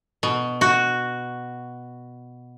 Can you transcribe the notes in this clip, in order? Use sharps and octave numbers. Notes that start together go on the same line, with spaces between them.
B2
F#4